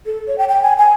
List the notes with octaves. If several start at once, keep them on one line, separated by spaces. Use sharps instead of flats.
A4
C#5
G5
G5
G#5
G#5